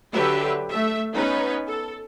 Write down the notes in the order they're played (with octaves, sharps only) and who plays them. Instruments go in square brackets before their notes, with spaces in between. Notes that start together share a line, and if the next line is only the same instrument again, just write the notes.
[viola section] D3 F#3 G4 B4 E5 G5
A3 E5
B3 C#4 D#4 B4
A4